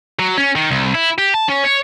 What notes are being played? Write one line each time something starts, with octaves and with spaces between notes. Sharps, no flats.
F#3
C#4
D#3
C2
E4
G4
A5
C#4
C#5